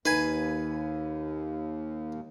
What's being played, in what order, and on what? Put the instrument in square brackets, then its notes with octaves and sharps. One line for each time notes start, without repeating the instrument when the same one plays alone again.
[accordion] D#2 [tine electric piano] D#4 [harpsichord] B4 G#5